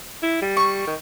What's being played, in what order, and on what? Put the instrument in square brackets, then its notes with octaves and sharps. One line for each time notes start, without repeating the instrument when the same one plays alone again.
[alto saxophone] E4
G3
[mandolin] C#6
[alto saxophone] D#3